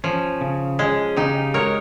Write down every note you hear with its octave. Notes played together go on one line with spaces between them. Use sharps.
F3 C#4
C#3
G#3 C#4
C#3 D#4 G4
G#3 A#4 C#5